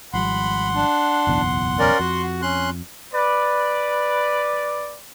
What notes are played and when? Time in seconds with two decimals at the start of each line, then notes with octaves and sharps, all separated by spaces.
0.13 G#1 F3 G3 F#5 B5 C6
0.74 D4
1.27 F#1 B1 E2
1.79 C#4 A#4 D5
1.99 F2 F#4
2.42 C#4 C6 F#6
3.13 B4 D5